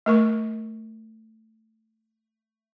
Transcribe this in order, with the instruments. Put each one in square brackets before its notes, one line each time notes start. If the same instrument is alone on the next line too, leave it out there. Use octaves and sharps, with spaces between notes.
[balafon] A3 A#4 C#6